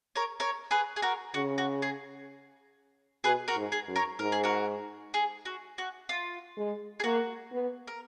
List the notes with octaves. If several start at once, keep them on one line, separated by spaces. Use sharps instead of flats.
A#4 C#5
A#4 C#5
G#4 B4
G#4
F#4 A#4
C#3 F#4
F#4
G#4
B2 G#4 B4
F#4 A#4
G#2
G#4
F#2
A#4 C#5
G#2 A#4
G#4
F#4 A#4
G#4
F#4
F#4
F4
G#3
G#4
A#3 F#4
B3
A#4